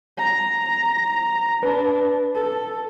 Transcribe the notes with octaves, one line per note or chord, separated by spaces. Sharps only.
A#5
D4 B4
A4